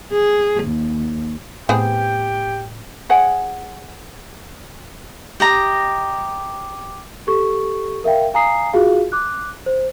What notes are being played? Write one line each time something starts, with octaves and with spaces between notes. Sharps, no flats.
G#4
D#2
A2 B3 C4 G4 G#4 G5
G#4 C#5 F#5 G#5
G4 D#5 A#5
G4 A4 C#6
A#4 E5 F5 G5
F5 G#5 A#5 D#6 C7
F4 F#4 G#4 F5
D6 F#6
C5